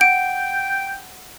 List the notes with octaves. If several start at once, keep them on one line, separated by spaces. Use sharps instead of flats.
F#5 G5 D7